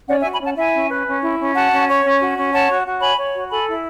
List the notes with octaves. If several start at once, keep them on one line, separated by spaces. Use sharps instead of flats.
C#4 D5 F#5
E5 G#5
F#4
G#5 B5
C#4 F#5 A5
E4 E5 G#5
C#4
B4
C#4
E4
C#4
F#4 F#5 A5
C#4
C#5
C#4
F#4
C#4
C#5 F#5 A5
F#4
F#4
C#5 G#5 B5
C#5
F#4
A4 G#5 B5
E4